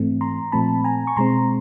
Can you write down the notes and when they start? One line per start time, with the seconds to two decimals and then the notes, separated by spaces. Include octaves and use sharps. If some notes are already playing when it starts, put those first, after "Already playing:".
Already playing: G#2 E3 A3 C4
0.21 A#5 C6
0.52 A#2 F3 A3 C4 A5 B5
0.84 G#5 A#5
1.07 C#6
1.17 B2 G#3 C4 A#5 C6